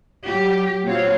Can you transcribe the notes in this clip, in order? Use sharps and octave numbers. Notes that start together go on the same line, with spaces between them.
F#3 G4
A#2 F#3 C4 C#5 F5